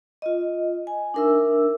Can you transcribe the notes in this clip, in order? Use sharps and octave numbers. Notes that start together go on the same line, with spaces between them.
F4 D#5
G#5
D4 D#4 A#4 E5 E6